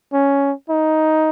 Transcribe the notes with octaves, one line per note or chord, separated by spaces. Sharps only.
C#4
D#4